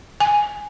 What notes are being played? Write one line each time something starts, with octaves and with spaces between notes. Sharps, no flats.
G#5